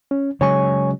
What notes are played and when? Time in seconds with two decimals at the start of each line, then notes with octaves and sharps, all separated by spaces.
0.11 C#4
0.41 C#3 F#3 G#3 C#5 G#5 C#6